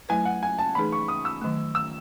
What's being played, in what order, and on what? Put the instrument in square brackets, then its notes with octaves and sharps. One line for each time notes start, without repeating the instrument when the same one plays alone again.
[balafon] F#3 A3 E4 B4 [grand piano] G#5
[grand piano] F#5
G#5
A5
[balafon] E3 A3 D#4 G#4 B4 [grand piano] B5
[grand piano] C#6
D#6
E6
[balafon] D#3 F#3 A3
[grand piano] E6